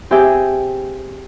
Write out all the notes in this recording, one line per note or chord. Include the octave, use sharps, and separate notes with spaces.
C4 G4 G#4 E5 G5 G#5